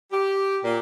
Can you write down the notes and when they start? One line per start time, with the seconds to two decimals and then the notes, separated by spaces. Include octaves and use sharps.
0.12 G4
0.64 A#2